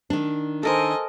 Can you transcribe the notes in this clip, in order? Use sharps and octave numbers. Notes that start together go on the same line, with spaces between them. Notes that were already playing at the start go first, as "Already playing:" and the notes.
D#3 D4
A4 A#4 C5 D#5 G#5